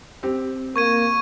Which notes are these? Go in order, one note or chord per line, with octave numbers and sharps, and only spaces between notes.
C4 G4
A#3 C#6 G#6 D#7